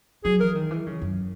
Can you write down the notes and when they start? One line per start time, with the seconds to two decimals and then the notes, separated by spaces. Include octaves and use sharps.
0.24 F#3 G#4
0.39 E3 A#4
0.55 D#3
0.71 E3
0.87 C#3
1.02 F#2